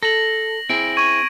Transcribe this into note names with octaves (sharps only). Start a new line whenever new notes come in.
A4 A#6 F#7
C4 E4 G#4 D7
C#6 G#6 D#7